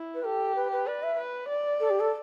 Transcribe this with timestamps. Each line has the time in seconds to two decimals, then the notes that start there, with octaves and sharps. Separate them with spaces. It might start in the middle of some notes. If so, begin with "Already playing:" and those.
Already playing: E4
0.15 B4
0.24 G4 A4
0.56 B4
0.72 B4
0.87 B4 D5
1.03 E5
1.18 B4
1.49 D5
1.80 A4
1.90 G4
2.00 A4